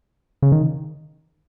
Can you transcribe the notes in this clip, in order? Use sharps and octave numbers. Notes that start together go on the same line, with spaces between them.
C#3
D#3